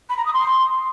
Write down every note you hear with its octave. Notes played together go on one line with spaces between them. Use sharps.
B5
A#5
D#6
C6